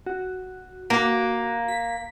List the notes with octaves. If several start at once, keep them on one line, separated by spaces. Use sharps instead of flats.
F#4
A#3 F#4
B6